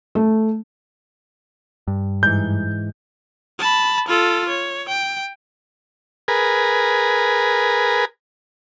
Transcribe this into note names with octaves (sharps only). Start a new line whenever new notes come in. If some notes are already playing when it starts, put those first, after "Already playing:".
A3
G2
G#2 E3 G6
A5 B5
F4 A4
C#5
G5
G#4 A#4 B4